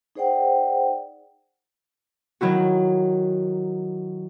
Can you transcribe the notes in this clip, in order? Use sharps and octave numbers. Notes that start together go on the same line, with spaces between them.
D#4 G#4 C5 D5 F#5 G5
D#3 F#3 E4 F#4